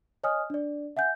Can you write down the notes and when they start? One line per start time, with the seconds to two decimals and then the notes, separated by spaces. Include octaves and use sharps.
0.24 C#5 D#5 G#5 D#6 F6
0.50 D4 D5
0.97 E5 F#5 G#5 G6